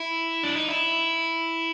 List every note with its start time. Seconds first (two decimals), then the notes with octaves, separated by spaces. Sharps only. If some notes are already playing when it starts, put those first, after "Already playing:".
Already playing: E4
0.43 D4
0.57 D#4
0.69 E4